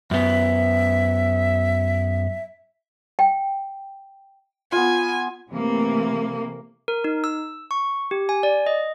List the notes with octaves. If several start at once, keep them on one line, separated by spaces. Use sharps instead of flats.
F#2 B3 E5
G5
B3 F4 G#5
C3 E3 A3 A#3
A#4
D#4
E6
C#6
G4
G#5
D5
D#5